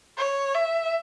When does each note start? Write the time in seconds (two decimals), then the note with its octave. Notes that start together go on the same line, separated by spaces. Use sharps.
0.18 C#5
0.55 E5